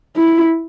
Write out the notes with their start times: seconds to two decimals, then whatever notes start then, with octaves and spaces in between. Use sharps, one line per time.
0.17 E4